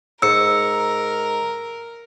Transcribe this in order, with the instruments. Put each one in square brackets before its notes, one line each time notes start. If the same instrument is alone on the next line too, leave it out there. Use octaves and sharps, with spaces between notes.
[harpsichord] G#2 [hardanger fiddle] A#4 [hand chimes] E6 C#7